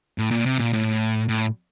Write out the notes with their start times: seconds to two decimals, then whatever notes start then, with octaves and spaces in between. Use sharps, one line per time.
0.18 A2
0.31 A#2
0.45 C3
0.59 A#2
0.73 A2
1.29 A2